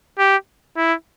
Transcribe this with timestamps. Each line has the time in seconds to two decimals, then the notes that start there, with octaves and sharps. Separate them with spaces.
0.19 G4
0.77 E4